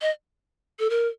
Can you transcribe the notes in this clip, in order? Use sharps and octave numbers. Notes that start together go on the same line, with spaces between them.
D#5
A4
A#4